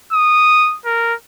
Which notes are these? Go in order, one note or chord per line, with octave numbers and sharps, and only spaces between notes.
D#6
A#4